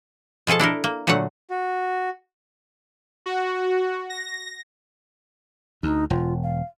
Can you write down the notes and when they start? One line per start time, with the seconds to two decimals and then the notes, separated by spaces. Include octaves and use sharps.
0.47 B2 F3 G#4 A4 A5
0.59 D4 E4 A4 A#4
0.84 A#3
1.07 A#2 D3 F#3 A3 F#5
1.51 F#4
3.26 F#4
4.10 A#6
5.83 D2 D#4
6.10 E1 F4
6.43 F5